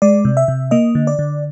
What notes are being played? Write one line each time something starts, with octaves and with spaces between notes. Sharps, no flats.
G#3 D5
C3
E5
C3
A#3 D#5
D3
D5
D3